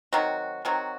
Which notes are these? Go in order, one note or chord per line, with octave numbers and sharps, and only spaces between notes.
D#3 F#3 C4 F#4
D#3 F#3 C4 F#4